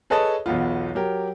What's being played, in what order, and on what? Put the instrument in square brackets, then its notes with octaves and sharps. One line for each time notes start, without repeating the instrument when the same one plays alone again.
[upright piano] G#4 A4 B4 C#5 D#5 A5
B1 E2 B3 F4
F#3 G4 A#4